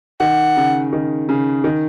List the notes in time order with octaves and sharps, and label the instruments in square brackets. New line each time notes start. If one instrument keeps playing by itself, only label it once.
[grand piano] D#3 [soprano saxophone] F#5
[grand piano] C#3
D#3
C#3
D#3